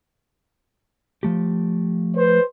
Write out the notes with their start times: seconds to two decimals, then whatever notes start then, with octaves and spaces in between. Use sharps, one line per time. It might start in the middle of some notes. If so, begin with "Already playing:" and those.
1.23 F3 A3 G4
2.17 B4 C5